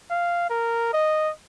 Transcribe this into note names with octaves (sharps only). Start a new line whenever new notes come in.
F5
A#4
D#5